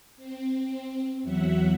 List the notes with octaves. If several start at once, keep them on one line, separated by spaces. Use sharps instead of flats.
C4
E2 F#3 E5 F#5